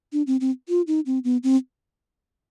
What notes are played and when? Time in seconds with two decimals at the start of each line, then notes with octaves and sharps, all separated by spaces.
0.13 D4
0.27 C4
0.41 C4
0.69 F4
0.87 D#4
1.06 C4
1.24 B3
1.43 C4